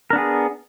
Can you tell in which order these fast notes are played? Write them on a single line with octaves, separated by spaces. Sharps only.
A#4 D4 B3 G#4